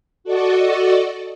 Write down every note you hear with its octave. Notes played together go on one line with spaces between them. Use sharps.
F#4 A4 D5 D#5 C#6